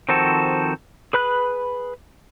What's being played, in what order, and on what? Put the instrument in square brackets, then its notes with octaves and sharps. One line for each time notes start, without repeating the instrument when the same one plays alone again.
[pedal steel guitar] D#3 F3 C4 F#4 A4
G#4 B4 B5 F#6